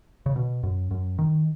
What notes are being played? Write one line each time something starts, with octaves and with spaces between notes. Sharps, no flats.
C#3
B2
F#2
F#2
D#3